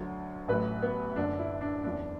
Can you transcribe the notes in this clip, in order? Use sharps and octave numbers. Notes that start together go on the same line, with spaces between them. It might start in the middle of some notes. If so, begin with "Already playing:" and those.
Already playing: D2 D3 F#3
A1 A2 F#3 B4
B3
F#1 F#2 D3 D4
E4
D4
F#1 E2 E3 D4